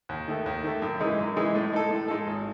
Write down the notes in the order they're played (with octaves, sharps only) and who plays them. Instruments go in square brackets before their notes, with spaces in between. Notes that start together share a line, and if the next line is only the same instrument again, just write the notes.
[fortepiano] D#2
D#3 A3
D#2
D#3 A3
F#2
E3 G#3 D#4
F#2
E3 G#3 D#4
A2
G#3 D#4 A4
A2
G#3 D#4 A4
G#1